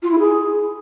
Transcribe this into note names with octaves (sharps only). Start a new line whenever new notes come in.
F4
E4
G#4